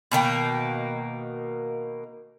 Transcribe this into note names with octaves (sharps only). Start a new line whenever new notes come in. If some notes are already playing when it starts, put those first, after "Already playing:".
B2 D#3 A#3 G5